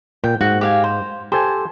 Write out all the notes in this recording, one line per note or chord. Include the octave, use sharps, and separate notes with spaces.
A#2 G5
G#2 F#4
G4 F5 G#5
C5
G4 A4 C5 G#5